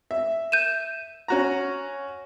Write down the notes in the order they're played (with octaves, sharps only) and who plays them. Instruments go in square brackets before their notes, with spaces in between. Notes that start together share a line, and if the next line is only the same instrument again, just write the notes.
[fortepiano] E5
[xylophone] G6 D#7 E7
[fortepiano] C#4 F#4 A#5